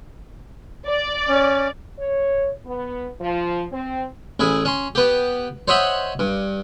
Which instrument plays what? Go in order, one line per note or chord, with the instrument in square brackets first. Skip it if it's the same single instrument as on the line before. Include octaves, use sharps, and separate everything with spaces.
[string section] D5
[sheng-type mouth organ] C#4
[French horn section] C#5
B3
F3
C4
[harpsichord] A1 E4 G#4
C#4 C6
B3 G4
C5 C#5 D#5 E5 F#5 B5
G2